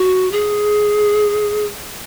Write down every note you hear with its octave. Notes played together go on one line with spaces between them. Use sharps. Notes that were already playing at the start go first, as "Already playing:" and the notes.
Already playing: F#4
G#4